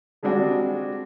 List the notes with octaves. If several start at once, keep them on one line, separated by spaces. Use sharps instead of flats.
G3 G#3 C4 D4 F#4